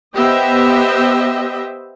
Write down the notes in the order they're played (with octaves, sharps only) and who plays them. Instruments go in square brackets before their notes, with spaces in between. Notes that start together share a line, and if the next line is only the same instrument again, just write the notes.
[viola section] B3 G4 C5 D#5 E5 G5